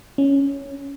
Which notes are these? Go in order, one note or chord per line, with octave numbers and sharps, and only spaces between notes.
C#4